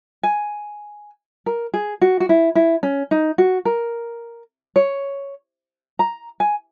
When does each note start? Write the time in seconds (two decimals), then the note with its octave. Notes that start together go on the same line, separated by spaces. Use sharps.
0.23 G#5
1.46 A#4
1.74 G#4
2.02 F#4
2.20 F#4
2.29 E4
2.55 E4
2.83 C#4
3.11 D#4
3.38 F#4
3.65 A#4
4.76 C#5
5.99 A#5
6.40 G#5